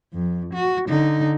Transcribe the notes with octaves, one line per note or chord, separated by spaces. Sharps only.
F2
F#4
D3 D#4